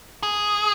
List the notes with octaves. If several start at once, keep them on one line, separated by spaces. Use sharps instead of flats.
G#4